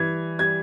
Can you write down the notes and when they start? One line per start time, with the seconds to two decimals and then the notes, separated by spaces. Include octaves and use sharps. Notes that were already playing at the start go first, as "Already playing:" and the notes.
Already playing: E3 G3 G#6
0.39 G3 G#6